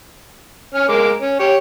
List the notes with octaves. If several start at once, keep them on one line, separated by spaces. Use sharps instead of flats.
C#4 F6
G#3 A#4 D6
C#4
G4 C#5